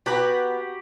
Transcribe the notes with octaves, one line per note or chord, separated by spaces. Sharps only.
B3 F#4 G4 B4 A#5